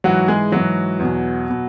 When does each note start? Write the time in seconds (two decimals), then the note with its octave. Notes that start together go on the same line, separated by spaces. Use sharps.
0.04 G#2 E3 F#3 F#4
0.28 G#3 G#4
0.52 G#2 E3 F#3 F#4
0.99 E2 B2
1.50 B2